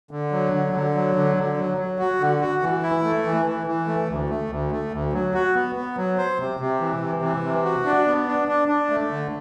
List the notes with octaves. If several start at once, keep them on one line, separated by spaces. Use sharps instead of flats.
D3
F#3
D3
D3
F#3
D3
D3
F#3
F#3
F#4
D3
F#4
E3
E4
A3
E3
E3
E3
A3
D2
A3
D2
A3
D2
F#3
F#4
B3
B3
F#3
C5
C3
C3
E3
C3
E3
C3
F#4
D4
B3
D4
D4
D4
A3
D3